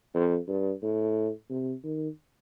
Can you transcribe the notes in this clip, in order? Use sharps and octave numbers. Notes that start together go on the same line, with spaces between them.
F2
G2
A2
C3
D#3